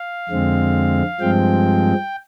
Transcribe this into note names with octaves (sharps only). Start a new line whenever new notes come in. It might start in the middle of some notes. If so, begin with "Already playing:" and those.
Already playing: F5
F2 D3 G#3 C4
G2 F3 G#3 C4 G5